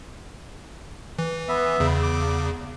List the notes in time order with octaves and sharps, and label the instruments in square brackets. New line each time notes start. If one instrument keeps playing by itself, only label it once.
[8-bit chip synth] E3
[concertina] B3 E5
[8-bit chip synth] E2 C#3
[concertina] D6